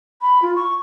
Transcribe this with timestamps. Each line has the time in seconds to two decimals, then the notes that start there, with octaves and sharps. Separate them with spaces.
0.22 B5
0.42 F4
0.56 C#6